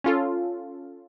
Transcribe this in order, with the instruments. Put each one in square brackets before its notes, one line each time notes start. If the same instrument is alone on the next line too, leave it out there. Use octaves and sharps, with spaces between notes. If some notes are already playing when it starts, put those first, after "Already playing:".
[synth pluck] C#4 F4 A4